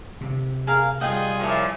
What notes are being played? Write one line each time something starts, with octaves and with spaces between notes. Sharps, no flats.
C3
G#4 A#4 F5
G3 F4 G#4 D#5 F#5 G5
A#2 F3 E4 C#5 C#6